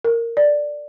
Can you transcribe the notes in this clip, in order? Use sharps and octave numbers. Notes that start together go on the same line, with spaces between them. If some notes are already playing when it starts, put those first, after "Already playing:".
A#4
D5